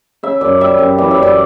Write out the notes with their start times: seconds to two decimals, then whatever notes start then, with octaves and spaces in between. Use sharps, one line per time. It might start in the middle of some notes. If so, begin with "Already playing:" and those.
0.23 C#3 E5
0.41 F#2 D5
0.61 G3 E5
0.79 F#2
0.98 E3 D5
1.11 E5
1.17 F#2
1.23 D5